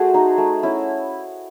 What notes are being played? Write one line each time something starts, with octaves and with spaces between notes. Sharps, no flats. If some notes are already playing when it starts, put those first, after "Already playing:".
Already playing: A3 F#4 G#4 C5
D#4
A3
C#4 E4